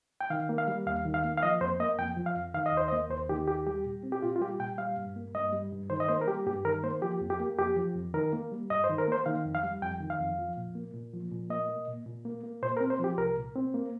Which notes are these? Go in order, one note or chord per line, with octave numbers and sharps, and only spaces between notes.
G5
D#3 F5
A#3
F5
G3
D#2 F5
D#3
F5
A#3
F5
F3 D#5
F2 C5
A#3 D#5
F2 G5
F3
F5
F2
D#3 F5
D#5
D#2 C5
D#5
A#3
D#2 C5
D#3 G4
D#2 G4
G3 G4
A#2
C4
G4
A#2 F4
F4
G3 G4
A#2 G5
G3 F5
G2
A#3
G2 D#5
G3
G2
D#3 C5
D#5
A#3 C5
A#4
G3 G4
G2 G4
D#3 A#4
A#3 C5
F3 G4
F2
G4
A#3
F2 G4
F3
F2
D#3 A#4
A#3
G3
G2 D#5
C5
D#3
A#4
A#3 C5
D#3 F5
F2
F5
G3
F2 G5
D#3
F5
F2
F3
A#2
A#3
A#2
F3
A#2
A#3 D#5
A#3
A#2
A#2
A#3
A#3
A#2 C5
A#4
C4
C5
F3 G4
C2 A#4
A#2
C4
A#3